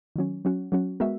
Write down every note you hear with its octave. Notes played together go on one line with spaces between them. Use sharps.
D#3 F#3 C#4
F#3 C#4 F#4
F#3 C#4 F#4
G#3 B3 F#4 A#4 E5